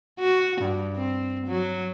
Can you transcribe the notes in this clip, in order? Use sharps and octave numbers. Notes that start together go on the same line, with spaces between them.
F#4
G2
C4
F#3